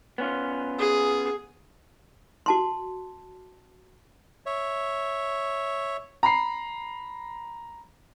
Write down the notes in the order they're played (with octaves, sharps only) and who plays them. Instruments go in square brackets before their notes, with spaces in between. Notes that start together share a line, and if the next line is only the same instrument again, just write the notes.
[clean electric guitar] B3 C#4 F4
[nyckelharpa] G#4
[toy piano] F#4 A5 C6
[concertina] C#5 E5
[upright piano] A#5 B5 C7